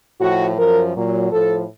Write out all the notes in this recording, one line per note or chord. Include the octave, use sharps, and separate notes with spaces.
A2 F3 F#4
F#2 F3 A#4
A#2 F#3
A2 F3 A4